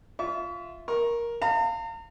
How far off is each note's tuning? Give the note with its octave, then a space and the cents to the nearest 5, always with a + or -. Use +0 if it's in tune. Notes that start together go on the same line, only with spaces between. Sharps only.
F4 -5 E5 +0 C#6 +40
A#4 +10 C#6 -20
F5 +0 A#5 -45